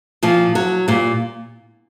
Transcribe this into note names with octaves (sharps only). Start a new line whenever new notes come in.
A#2 F3
F#3
A#2 G3